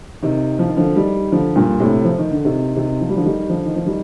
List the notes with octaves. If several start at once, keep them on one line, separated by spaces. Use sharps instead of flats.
C3 D#3
F3
D#3
D3 F3
D#3 G3
D3 F3
G2 A#2
A2 C3
F3
D#3
D3
C3 D#3
C3 D#3
F3
G3
D3 F3
D#3 G3
D3 F3
D#3
F3
D#3 G3